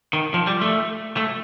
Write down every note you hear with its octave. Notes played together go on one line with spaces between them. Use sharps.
D#3
F3
G3
A3
A3